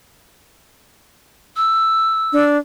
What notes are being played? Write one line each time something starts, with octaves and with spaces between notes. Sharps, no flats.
E6
D4